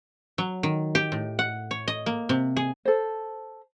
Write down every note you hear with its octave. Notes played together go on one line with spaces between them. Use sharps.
F#3
D#3
G4
A2
F#5
C#5
D#5
A#3
C3
G#4
A4 C5